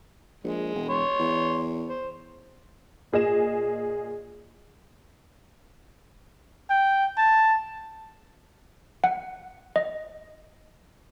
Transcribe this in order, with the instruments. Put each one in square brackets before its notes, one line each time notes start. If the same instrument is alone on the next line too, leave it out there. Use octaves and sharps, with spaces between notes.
[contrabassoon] A#1 [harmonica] G#3
[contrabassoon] E1
[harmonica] C#5 C6
[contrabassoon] E2
[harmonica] C5
[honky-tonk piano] A#2 G#4 D#5 E7
[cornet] G5
A5
[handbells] F#5
D#5